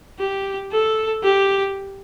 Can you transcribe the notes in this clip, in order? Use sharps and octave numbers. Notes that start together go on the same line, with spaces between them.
G4
A4
G4